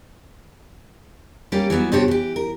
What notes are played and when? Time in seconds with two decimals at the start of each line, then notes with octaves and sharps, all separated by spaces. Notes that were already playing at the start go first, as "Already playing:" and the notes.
1.52 G3 A#3 C#4 G4
1.70 E3 F#3 B3 F#4
1.92 G2 C3 D4 F#4 G4 C#5
2.08 E3 G4
2.36 A#4